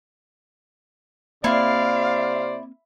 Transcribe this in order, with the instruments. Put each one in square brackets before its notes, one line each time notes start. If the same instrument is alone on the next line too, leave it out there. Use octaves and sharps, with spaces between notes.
[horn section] C3 C5 D5 [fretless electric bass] A#3 C4 [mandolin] E4 [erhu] F5